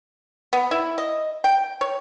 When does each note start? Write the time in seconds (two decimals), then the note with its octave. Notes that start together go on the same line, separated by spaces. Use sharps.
0.53 B3
0.71 E4
0.98 D#5
1.44 G5
1.81 C#5